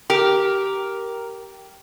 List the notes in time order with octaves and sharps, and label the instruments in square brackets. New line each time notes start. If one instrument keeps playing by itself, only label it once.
[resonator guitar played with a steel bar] G4 [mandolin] A#4